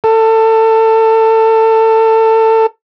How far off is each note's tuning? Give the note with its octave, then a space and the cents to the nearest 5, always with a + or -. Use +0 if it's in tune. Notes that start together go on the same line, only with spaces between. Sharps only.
A4 +25